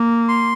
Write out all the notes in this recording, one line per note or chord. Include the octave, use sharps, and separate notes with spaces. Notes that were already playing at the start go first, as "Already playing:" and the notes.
Already playing: A#3
C6